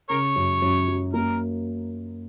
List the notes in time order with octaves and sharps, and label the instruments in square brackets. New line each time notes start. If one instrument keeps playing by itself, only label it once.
[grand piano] C#3 [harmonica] A#4 C#5
[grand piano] F#2
F#2
F#3
[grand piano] A#3 [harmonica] A#4